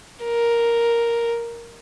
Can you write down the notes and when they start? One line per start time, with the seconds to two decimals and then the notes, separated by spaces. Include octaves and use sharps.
0.24 A#4